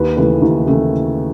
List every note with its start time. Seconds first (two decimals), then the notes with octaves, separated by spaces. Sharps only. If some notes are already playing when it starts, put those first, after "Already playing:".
Already playing: D#2 B4
0.17 C#3 E3 A3 C#4 B4
0.42 D#2
0.67 C#3 E3 A3 C#4